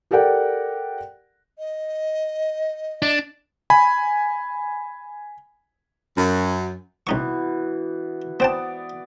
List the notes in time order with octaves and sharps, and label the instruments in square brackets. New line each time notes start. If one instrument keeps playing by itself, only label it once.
[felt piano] G4 A4 A#4 D5 F#5 G5
[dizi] D#5
[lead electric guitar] D4
[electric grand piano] G#5 B5
[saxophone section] F#2
[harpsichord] C2 D#4 C#6 [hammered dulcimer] B2 E3
[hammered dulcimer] B3 D5 [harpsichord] C4 G5 A5